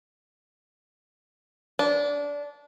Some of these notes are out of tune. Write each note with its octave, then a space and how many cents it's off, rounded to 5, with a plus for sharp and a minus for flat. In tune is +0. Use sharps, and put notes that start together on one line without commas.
D4 -20